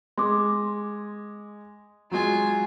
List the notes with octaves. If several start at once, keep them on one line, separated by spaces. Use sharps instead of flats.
G#3 C6 D6
F#3 G#3 F4 G#5